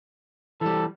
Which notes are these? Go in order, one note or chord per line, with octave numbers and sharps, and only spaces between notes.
E3 G3 A4